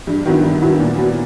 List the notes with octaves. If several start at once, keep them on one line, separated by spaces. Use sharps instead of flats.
G2
D#3 F#3 B3 E4
G2
D#3 F#3 B3 E4
A#2
F#3 B3